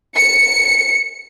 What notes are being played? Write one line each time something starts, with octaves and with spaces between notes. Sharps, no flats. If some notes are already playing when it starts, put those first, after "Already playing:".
C#7